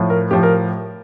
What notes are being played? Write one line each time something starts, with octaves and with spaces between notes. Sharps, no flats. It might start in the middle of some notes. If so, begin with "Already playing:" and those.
Already playing: A2 F3
A#4
A2 F3 G4
A#4